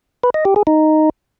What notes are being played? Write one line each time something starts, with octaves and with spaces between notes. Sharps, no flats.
B4
D#5
G4
G#4
D#4